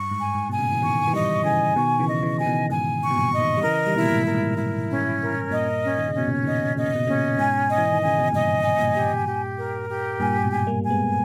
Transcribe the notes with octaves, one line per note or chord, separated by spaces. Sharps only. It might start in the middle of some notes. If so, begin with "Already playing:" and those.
Already playing: G2 C#6
G#2
G#5
G#2
B2 G#5
A#2 C#3
E3
B2 D#3 C#6
E3
D#3 G3 D#5
C#3 E3 G#5
B2 D#3 C#6
C#3 E3
D#5
C#3 E3
E3 G#5
B2 D#3
G#2 B2 G#5
C#6
B2
G2 A#2
D#5
B2 D#3
G3
C#3 E3 A#4
D#3 G3
B2 E4
A#2
G#2
A#2 A#4
G#2
E4
C#4
A#4
G2 A#2 D#5
C#4
D#3
C#3
B2 C#4
A#2 C#3
B2 D#3 D#5
A#2 C#3 D#5
B2
A#2 C#3 C#4
G#2 B2 G#5
D#5
E3
D#3
C#3 G#5
B2
G2 A#2 D#5
G#5
G2 A#2
G4
G4
A#4
G4
G2 A#2 G#5
G#2 B2
G#5
G3 A#3
G#5
G#3 B3